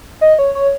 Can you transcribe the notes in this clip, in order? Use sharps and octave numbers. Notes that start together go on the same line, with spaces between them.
D#5
C#5
C#5